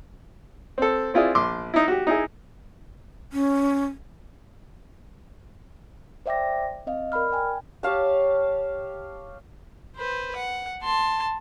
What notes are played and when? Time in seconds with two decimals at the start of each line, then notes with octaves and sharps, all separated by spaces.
0.78 C4 A4
1.14 C4 E4 F4 G#4 D5
1.35 A#1 C6 D6
1.74 D#4 E4
1.88 F#4 G4
2.07 D#4 E4 G#4
3.33 C#4
6.26 C5 D5 E5 G5 D6 A#6
6.87 C4 D#5 F5
7.12 A#4 D5 B5 F6
7.32 G5 G#5
7.83 G4 C#5 F5 A5
9.97 B4 C5
10.36 F#5
10.83 A5 C6